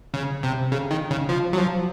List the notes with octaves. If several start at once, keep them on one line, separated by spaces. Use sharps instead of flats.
C#3
C3
C#3
D#3
C#3
F3
F#3
F3